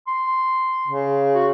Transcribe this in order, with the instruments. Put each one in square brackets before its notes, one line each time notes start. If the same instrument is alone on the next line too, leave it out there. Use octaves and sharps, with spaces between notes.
[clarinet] C6
[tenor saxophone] C#3
[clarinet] F#4